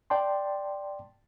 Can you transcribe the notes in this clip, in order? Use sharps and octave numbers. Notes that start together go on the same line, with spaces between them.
D5 G5 A5 C6